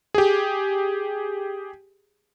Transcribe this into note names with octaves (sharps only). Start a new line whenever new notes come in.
G4 G#4